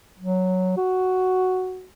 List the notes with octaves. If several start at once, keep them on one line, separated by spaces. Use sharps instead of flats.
F#3
F#4